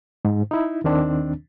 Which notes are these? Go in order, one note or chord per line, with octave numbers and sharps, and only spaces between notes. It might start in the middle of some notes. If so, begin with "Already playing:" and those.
G#2
D#4 E4
D#2 D#3 C4 D4